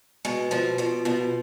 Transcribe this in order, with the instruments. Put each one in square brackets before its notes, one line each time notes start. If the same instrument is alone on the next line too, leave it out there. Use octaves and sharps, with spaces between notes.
[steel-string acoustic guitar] B2 G#3
B2 F3
B2 F3
B2 F3